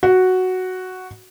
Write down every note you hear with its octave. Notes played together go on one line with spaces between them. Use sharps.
F#4